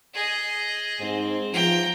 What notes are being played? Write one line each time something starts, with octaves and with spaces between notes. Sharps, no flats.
G#4 D#5
G#2 C4
E2 F3 G5 A#5